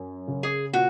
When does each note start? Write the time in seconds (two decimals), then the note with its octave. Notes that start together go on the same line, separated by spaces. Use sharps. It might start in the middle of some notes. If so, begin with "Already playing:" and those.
Already playing: F#2
0.28 C#3
0.43 G#4
0.73 A#2 F#4